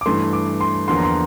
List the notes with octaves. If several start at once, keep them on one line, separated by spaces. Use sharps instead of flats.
D6
G2 E3 A3 C6
D6
C6
E2 D3 F3 A#3 C6
A#5
C6